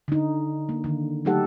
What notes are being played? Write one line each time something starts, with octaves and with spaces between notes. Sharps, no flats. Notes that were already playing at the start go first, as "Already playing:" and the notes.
D3 D#4
A#3
D3 D#3
F#3 A3 D#4 G4 A4 F#5